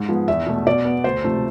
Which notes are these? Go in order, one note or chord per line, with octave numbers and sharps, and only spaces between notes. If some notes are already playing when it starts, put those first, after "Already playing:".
Already playing: G#2
F3 G#3 B3
E2 E5
B2 A3
B2 D5
B3
D2 C5
C3 F3 A3